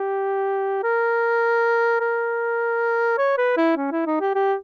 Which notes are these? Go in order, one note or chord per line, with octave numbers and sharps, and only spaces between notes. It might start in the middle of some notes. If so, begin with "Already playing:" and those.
Already playing: G4
A#4
A#4
C#5
B4
E4
C#4
E4
D#4
G4
G4